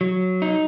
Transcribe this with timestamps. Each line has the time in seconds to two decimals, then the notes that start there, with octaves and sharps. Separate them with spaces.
0.01 F#3
0.42 D#4